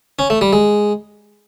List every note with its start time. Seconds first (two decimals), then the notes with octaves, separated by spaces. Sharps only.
0.19 C#4
0.30 A3
0.41 G3
0.53 G#3